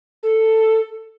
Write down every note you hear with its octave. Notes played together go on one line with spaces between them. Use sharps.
A4